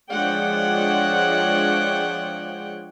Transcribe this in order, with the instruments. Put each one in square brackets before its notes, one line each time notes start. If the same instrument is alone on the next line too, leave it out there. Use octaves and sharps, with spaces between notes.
[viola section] F3 G#3 D4 C#5 F#5 G5